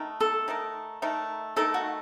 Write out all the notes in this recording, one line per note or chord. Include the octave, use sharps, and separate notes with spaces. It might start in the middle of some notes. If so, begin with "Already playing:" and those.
Already playing: D#3 A3 D#4 A#4
A4
D#3 A3 D#4 A#4
D#3 A3 D#4 A#4
D#3 A3 D#4 A4 A#4
F#4